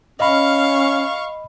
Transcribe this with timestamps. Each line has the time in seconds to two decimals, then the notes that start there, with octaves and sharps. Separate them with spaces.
0.20 C#4 D#5 F5 B5 C#6